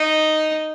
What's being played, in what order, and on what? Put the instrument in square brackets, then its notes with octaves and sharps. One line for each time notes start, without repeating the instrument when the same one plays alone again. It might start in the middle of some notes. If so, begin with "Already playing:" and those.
Already playing: [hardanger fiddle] D#4